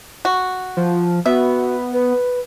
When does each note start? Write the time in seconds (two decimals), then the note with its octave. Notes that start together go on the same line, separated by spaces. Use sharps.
0.25 F#4
0.77 F3
1.26 B3 F#4 E5
1.93 B4